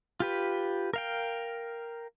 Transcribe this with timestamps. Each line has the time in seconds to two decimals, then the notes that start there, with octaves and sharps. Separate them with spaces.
0.20 F4 G4 B4
0.94 A#4 F5 G5